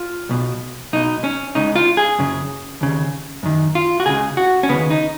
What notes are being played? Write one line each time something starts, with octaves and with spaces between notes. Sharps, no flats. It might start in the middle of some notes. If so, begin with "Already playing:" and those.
Already playing: F4
B1 B2
B1 B2 D#4
C#4
C#2 C#3 D#4
F4
G#4
F#2 C#3
D#2 C#3
F#2 D#3
F4
F#4
C#2 C#3 G#4
F#4
C#4
D#2 C#3 B3
D#4